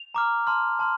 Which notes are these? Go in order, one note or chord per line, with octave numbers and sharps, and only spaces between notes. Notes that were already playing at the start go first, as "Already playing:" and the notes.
Already playing: F7
A#5 D6 F6
A5 C6 F6
A5 C6 F6